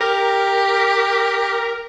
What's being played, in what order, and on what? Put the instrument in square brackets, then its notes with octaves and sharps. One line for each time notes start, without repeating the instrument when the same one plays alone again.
[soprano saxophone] G4 [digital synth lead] A#4